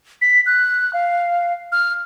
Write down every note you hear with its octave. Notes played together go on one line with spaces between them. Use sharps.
B6
F#6
F5
F6